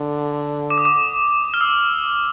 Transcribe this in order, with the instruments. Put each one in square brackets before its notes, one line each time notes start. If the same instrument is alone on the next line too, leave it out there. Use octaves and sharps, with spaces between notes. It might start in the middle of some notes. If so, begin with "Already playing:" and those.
Already playing: [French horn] D3
[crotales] D6
D#6
D6
F6
E6